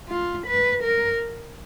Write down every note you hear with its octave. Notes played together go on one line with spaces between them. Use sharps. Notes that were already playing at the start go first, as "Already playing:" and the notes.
F4
B4
A#4